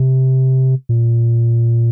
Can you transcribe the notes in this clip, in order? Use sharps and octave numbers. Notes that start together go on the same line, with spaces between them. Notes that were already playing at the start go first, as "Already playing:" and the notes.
Already playing: C3
A#2